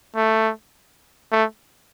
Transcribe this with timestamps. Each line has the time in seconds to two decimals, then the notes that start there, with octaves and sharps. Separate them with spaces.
0.16 A3
1.32 A3